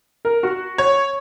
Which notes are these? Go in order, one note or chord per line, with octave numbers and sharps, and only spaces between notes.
A#4
F#4
C#5